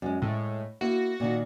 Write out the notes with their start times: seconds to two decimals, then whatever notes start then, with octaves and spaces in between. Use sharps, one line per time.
0.02 F#2 G#3
0.22 A2 G#3
0.81 A#3 E4 F#4
1.20 A#2 D#3 D#4